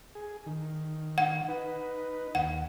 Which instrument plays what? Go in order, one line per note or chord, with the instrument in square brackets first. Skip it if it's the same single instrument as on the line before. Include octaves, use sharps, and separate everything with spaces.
[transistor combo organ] G#4
D#3
[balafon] F#5
[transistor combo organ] D#4 B4
[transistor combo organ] D#2 [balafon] F#5